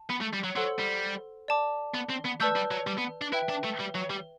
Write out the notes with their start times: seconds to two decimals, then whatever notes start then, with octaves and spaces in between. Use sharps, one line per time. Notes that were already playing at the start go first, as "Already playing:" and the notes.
Already playing: A5
0.10 B3
0.21 A3
0.33 G3
0.44 F#3
0.56 F#3 A4 C5 F#5 C6 E6
0.79 G3
1.48 D5 A5 D6
1.94 B3
2.10 C4
2.25 B3
2.40 A3 B4 D5 A5 E6 G6
2.56 G3
2.71 F#3
2.87 G3
2.98 B3
3.21 D4
3.32 E4 B4 E5 G5
3.49 D4
3.63 A3
3.79 G3
3.95 F#3
4.10 G3